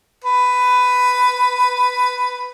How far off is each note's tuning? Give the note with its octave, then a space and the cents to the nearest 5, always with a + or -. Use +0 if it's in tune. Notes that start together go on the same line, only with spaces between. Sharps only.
B4 +10